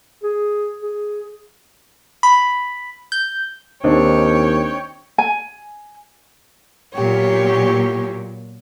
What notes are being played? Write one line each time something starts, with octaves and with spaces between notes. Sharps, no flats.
G#4
G#4
B5
G6
D#2 C4 D4 D#4 C#5 G5
G#5
A#2 F#3 B3 G4 C#5